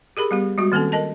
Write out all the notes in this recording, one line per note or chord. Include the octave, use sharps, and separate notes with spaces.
G4 G#4 A#4 B5
G3 B3 G4
G3 G#3 F#4
D#3 A#3 C4 C#4 A4
A#4 D#5 A5